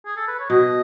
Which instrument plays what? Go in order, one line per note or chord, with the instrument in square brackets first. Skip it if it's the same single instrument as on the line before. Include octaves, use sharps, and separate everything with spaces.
[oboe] G#4
A4
B4
C#5
[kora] B2 [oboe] D#5